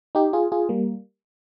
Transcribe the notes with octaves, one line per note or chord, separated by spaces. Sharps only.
D#4 G4
F4 G#4
F4 G#4
G3 A#3